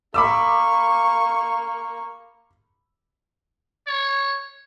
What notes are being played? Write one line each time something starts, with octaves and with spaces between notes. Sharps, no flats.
A#3 B5 C#6 D6 E6
C#5